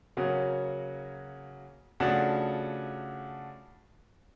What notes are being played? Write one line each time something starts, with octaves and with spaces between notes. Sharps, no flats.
C#3 F#3 A#3 C#4 F#4
C#3 F3 A3 D4 F#4